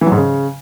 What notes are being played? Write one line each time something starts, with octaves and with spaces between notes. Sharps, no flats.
E3
F#3
G#2
C#3